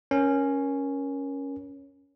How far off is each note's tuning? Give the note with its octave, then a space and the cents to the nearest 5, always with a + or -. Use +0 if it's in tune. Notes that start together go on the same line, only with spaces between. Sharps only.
C#4 +0 A#4 +20